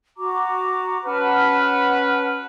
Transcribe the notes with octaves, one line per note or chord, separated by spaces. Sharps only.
F#4 A#5 D6
C#4 F#4 B4 F#5 A5 F6